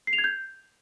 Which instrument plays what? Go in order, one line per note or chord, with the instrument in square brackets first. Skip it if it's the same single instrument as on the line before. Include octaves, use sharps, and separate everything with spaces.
[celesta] C7
F7
G#6
G6